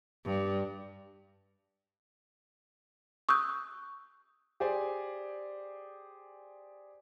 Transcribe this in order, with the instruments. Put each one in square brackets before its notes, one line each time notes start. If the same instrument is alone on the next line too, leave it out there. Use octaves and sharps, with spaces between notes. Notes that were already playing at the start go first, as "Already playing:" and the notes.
[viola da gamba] G2
[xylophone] C#6 D#6 E6 F#6 G6
[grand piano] G4 G#4 C5 D5 G#5